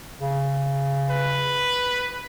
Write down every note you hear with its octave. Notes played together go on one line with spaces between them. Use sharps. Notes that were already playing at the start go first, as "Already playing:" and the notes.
C#3
B4